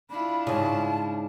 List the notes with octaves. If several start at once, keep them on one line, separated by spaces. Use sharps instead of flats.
D4 E4 F4 B5
G#2 C#3 A5